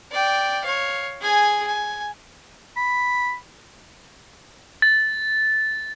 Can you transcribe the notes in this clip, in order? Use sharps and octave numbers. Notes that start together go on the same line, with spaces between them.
D5 G5
C#5 F5
G#4 G#5
G#5
B5
A6